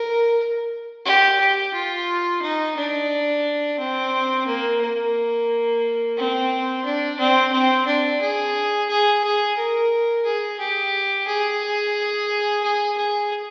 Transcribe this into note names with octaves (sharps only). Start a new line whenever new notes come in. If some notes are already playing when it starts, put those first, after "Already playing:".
Already playing: A#4
G4
G4
F4
D#4
D4
C4
A#3
A#3
C4
D4
C4
C4
D4
G#4
G#4
G#4
A#4
G#4
G4
G#4
G#4
G#4